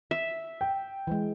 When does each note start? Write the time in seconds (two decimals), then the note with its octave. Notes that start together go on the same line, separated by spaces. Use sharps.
0.11 E5
0.61 G5
1.07 E3 G#3